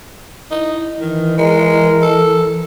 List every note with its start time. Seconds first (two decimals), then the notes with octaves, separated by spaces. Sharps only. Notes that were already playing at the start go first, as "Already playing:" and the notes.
0.51 D#4 E4
1.00 D#3 E3
1.38 G#3 A#4
2.02 A4